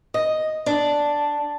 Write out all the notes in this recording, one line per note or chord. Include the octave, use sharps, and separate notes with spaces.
D#5
D4